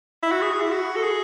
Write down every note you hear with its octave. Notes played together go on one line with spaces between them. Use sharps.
E4
F#4
G#4
E4
F#4
A4
G#4